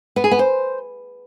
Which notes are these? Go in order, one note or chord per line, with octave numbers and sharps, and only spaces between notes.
B3
G#4
B3
C5